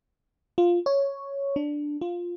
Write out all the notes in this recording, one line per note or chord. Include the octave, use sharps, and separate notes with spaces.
F4
C#5
D4
F4